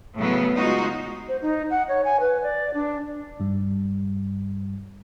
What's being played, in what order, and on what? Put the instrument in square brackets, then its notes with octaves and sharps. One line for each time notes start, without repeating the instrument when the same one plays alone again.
[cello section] A2 C#3 F#3 B3
G#3 D#4 F4 F#4
[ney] C5
D#4
F#5
C#5
G#5
B4
D5
D4
[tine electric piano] G2 G3